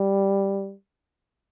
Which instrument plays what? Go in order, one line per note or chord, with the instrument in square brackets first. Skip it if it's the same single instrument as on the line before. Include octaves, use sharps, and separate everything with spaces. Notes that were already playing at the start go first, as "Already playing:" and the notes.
Already playing: [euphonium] G3